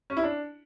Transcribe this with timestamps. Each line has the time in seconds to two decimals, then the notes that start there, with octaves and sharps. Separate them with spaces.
0.10 C#4
0.17 E4
0.24 D4